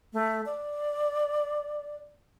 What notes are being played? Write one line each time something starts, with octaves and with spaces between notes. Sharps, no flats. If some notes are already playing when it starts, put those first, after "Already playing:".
A3
D5